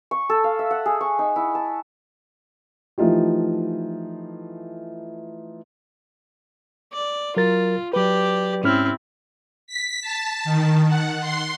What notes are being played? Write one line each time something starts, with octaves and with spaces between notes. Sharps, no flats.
C#6
A4
F5
E5
F#5
G#4
C#6
D#4
E4
A5
E3 F3 A3 D#4 F4 G4
D5
F#3 F4 A#4 A6
F#3 G4 B4 D5
G#2 C4 C#4 E4 F6
B6
A5
D#3
F#5
C6